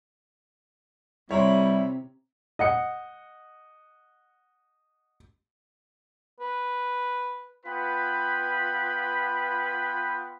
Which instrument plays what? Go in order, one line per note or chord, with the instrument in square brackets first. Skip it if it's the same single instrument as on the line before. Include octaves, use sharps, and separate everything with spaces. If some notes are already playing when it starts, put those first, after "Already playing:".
[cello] C3 [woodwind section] G3 [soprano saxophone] E4 [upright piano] C#5 A#5 C6
[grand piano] D#5 F#5 C#7
[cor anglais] B4
[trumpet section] B3 F4 B4 G5 B5